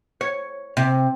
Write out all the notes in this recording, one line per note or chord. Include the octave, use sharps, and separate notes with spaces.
C#5
C3